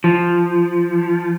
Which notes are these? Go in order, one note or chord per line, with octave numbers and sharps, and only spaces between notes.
F3